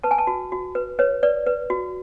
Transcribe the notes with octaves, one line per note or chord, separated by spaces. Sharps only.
B4 A5
G#5
A5
F#4
F#4
B4
B4 C#5
B4 D5
B4
F#4